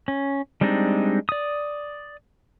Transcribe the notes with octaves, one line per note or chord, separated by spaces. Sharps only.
C#4
G3 G#3 C4 D4 D#4
D5 D#6